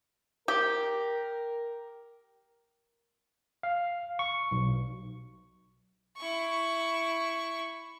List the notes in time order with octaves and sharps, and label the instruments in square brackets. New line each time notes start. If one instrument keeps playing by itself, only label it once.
[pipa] G4 [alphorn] A#4
[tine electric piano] F5
C#6
B1
[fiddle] E4 C#6